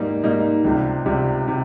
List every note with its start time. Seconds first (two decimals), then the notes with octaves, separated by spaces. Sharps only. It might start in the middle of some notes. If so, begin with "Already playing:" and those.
Already playing: G#2 G3 A#3 D#4
0.24 G#2 G3 A#3 D#4
0.64 C#2 C3 G3
1.06 C#2 C3 G3
1.48 C3